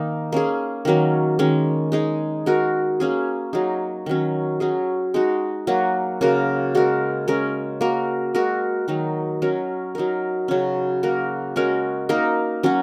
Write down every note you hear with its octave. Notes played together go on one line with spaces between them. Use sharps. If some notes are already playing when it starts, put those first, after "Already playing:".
Already playing: D#3 A#3 D#4
A#3 C#4 G#4
D#3 F#3 A#3 C#4
D#3 G#3 C#4
G#3 D#4 G#4
G#3 F#4 A#4
A#3 C#4 G#4
F#3 D#4 G#4
D#3 F#3 C#4
F#3 C#4 G#4
G#3 D#4 F#4
F#3 A#3 F#4
C#3 A#3 F#4 A#4
G#3 F#4 A#4
G#3 C#4 A#4
A#3 F#4 A#4
G#3 F#4 A#4
D#3 F#3 D#4
F#3 C#4 A#4
F#3 D#4 A#4
C#3 F#3 C#4
A#3 F#4 A#4
G#3 C#4 F#4 A#4
A#3 D#4 A#4
F#3 C#4 F#4